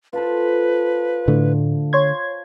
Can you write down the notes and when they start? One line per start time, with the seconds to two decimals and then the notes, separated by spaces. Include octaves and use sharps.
0.13 F4 A4 B4 C5
1.28 A2 D3 A3
1.93 C#5 C6 G#6